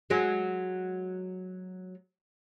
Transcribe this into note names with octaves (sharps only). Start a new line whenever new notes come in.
F#3 G#3